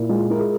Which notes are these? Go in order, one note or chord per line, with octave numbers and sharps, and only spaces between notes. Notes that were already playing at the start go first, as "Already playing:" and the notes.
Already playing: A#2 E4
G#3 F4
E4 A#4
G#4